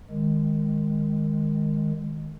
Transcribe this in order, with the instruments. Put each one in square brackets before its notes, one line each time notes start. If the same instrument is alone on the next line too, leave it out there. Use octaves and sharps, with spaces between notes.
[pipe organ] D#3 G#3